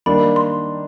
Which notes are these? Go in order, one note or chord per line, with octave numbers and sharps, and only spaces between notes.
D#3 G3 A#3 D4 B5
C6